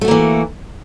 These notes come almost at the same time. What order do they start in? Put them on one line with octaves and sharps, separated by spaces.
A3 F#4 A#3 E3